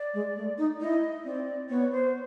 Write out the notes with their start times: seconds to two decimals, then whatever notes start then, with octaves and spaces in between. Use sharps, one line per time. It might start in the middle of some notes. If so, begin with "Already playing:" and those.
Already playing: D5
0.14 G#3
0.36 A3
0.58 D#4
0.80 E4 D#5
1.25 C4 D5
1.69 B3 C#5
1.92 C5